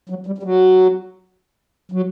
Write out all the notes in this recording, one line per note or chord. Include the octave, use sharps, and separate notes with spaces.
F#3
G3
G3
F#3
F#3